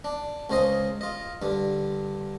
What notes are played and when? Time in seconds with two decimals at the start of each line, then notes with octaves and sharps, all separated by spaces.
0.04 D4
0.50 C#2 C#3 C5 D#5 D#6
1.01 F4 D#5
1.42 G2 D3